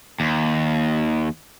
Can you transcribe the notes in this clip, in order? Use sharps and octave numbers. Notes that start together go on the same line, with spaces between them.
D#2